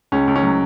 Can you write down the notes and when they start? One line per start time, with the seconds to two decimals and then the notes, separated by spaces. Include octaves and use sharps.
0.12 C#2 C#4
0.28 C#2
0.36 C#4
0.43 F#3